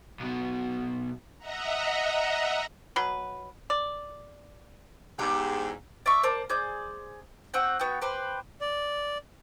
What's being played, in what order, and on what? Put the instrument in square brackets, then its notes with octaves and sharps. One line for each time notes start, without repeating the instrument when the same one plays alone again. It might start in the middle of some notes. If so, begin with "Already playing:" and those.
[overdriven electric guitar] B1 B2
[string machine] D#5 E5 F#5 A#5
[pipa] B2 F#3 B4
D5
[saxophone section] E2 G#2 [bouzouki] G4 G5
[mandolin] D5 E5 C#6
A#4 C5 D5 A5
G#4 C5 D5 G6
C4 F#4 F#5 G5
B3 F#4 G5
G4 B4 C5 C6
[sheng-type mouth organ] D5